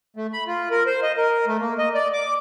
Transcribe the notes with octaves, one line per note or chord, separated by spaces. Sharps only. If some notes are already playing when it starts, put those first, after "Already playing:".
A3
B5
F4
A#4
C5
D#5
A#4
A3
A#3
D#5
D5
D6